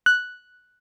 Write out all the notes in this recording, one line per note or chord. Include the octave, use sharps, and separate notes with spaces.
F#6